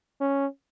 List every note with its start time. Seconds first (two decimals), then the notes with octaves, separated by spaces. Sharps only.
0.21 C#4